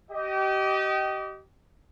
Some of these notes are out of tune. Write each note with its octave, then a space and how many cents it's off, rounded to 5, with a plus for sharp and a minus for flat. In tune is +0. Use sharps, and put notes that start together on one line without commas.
G4 -30 D#5 +0